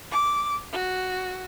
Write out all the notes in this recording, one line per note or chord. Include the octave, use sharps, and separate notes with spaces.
D6
F#4